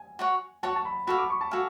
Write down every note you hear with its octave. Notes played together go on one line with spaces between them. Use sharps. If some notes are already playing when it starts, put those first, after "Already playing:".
Already playing: G#5
F#4 C#5 F#5
F#4 C#5 F#5 A5
A5
B5
F#4 A4 F5 B5
D6
C#6
A5
F#4 A4 F5 G#5